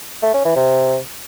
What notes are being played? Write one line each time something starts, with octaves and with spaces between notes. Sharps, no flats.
A3
C#4
E3
C3